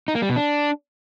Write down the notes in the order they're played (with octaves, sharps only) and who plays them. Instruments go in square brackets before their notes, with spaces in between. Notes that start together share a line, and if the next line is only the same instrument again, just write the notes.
[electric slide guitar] D#4
A#3
G3
B2
D4